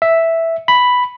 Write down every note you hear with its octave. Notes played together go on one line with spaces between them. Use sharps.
E5
B5